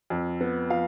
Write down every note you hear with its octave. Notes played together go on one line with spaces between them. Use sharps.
F2
B3
F3 F5